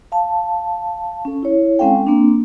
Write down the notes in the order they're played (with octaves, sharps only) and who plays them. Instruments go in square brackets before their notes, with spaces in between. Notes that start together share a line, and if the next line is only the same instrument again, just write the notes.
[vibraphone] F5 A5
C#4 A4
E4 C#5
G#3 C4 C#4 A4 F5 G5
A#3 C4 D4